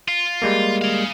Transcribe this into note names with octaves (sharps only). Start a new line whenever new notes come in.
F4
G3 G#3 A#3
G#4 F5